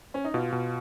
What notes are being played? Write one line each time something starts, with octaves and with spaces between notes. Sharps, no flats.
C#4
D#4
B2 F4
B2